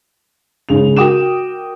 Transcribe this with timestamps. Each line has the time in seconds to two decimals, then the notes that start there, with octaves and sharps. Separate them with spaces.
0.69 G#1 C#3 G#4 F7
0.97 F#4 A#4 G5 D6 D#6 E7